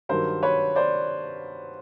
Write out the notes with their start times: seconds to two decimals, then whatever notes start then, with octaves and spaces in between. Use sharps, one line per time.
0.09 G2 D#3 F#3 A#4 C5
0.43 B4 C#5
0.76 C5 D5